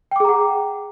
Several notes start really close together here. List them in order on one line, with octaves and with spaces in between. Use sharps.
G5 D6 G#4 A#5 F#5